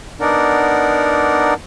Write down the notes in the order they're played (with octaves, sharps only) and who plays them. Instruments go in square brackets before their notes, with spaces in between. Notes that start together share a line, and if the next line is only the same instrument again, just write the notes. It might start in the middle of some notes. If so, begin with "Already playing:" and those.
[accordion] B3 D4 D#4 A#4 D5 F#5